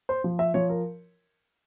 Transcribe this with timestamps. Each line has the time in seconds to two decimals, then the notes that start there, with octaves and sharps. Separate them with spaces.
0.09 C5
0.24 F3
0.39 E5
0.54 F3 C#5
0.69 A#4